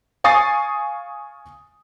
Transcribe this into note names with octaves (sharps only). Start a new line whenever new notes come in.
F5 G#5 C#6 D#6 A6 C7